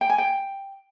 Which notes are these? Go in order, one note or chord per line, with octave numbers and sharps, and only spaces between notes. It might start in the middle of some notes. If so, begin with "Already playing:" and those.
G5
G#5
G5